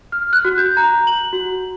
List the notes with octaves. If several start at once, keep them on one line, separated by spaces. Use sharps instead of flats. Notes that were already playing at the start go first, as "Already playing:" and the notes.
F6
F#6
F#4
G6
A#5
F#7
F#4